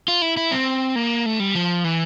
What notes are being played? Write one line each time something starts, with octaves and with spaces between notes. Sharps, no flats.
F4
E4
E4
C4
A#3
A3
G3
F3
E3